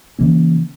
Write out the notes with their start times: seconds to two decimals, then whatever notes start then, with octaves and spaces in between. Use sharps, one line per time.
0.19 C#3 E3 A#3 C#4